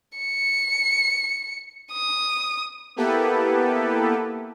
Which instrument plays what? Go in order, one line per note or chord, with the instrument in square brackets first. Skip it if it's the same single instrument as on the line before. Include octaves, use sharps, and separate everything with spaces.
[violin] C#7
D#6
[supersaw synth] A#3 B3 E4 G4 A4 B4